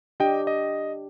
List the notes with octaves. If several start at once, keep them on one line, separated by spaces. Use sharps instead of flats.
D4 G4 D#5 G5
D#5